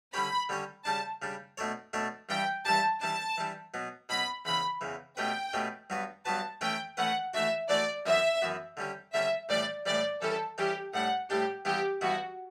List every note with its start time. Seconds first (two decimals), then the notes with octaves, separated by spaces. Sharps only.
0.13 D3 G3 C#4 G4 C#5 B5
0.49 D3 G3 C#4 G4 C#5
0.85 C#3 G3 D4 A5
1.22 C#3 G3 D4
1.57 B2 A3 D4 A4 C#5
1.93 B2 A3 D4 A4 C#5
2.29 G2 E3 G3 D4 G4 G5
2.65 G2 E3 G3 D4 G4 A5
3.01 E3 G3 D4 A5
3.38 E3 G3 D4
3.74 B2 F#3 B3
4.09 B2 F#3 B3 B5
4.45 E2 C#3 E3 B5
4.81 E2 C#3 E3
5.17 B2 A3 C#4 G4 B4 G5
5.53 B2 A3 C#4 G4 B4
5.90 G2 F#3 B3 F#4 B4
6.25 G2 F#3 B3 F#4 B4 A5
6.61 E3 A3 C#4 E4 B4 G5
6.97 E3 A3 C#4 E4 B4 F#5
7.34 E3 A3 D4 F#4 E5
7.69 E3 A3 D4 F#4 D5
8.06 F#2 E3 B3 F#4 E5
8.42 F#2 E3 B3 F#4
8.77 D3 G3 C#4 G4
9.13 D3 G3 C#4 G4 E5
9.49 A2 E3 G3 D5
9.86 A2 E3 G3 D5
10.21 E3 G3 C#4 E4 A4
10.58 E3 G3 C#4 E4 G4
10.94 A2 G3 D4 F#5
11.30 A2 G3 D4 G4
11.65 G2 E3 B3 E4 G4
12.01 G2 E3 B3 E4 F#4